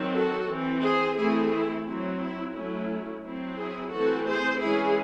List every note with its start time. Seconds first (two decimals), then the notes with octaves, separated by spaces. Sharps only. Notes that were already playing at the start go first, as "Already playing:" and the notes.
Already playing: D#3 F#3 C4
0.14 F#4 A4
0.47 E3 C4
0.82 G#4 C5
1.17 E3 A3 C4 E4 G#4
1.52 E4
1.86 F#3 C4 E4
2.21 E4
2.54 F#3 A3 C#4 E4
3.24 F#3 C4 E4
3.58 E4 G#4
3.93 E3 A3 C4 F#4 A4
4.27 G#4 C5
4.61 E3 G#3 C#4 E4 G#4